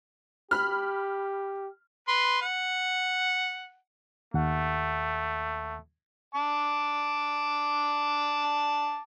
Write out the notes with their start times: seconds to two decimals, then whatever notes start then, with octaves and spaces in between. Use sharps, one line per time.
0.51 G4 B5 F6
2.08 B4 C6
2.42 F#5
4.34 D#2 A3 F#5
6.35 A5 D6